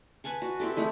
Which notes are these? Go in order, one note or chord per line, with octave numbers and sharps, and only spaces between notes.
B4 G#5 A5 C#6
F#4
C4 E4 G4 A4
G#3 A3 E4